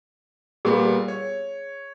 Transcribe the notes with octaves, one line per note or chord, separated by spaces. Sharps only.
A#2 G3 B3 G#4
C#5